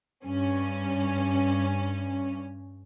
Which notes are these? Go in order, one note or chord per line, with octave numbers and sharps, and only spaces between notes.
G2 C#4